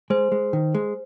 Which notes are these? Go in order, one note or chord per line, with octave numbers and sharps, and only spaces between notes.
G#3 C5
G#3
D#3
G#3